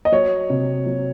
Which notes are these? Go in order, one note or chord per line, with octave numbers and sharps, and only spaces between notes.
D#5
F#3 C#5
C3
F#3